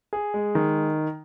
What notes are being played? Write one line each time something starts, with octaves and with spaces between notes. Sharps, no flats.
G#4
G#3
D#3